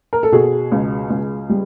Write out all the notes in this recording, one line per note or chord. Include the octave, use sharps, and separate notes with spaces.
A#4
A4
B2 F#4 G#4
C#2
C#2
G3